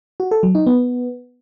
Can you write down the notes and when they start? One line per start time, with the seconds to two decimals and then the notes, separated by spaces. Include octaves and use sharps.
0.20 F#4
0.31 A4
0.43 F#3
0.55 D#4
0.66 B3